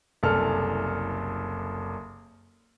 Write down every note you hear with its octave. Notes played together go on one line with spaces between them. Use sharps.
F#1 C2 G#4 A4 F6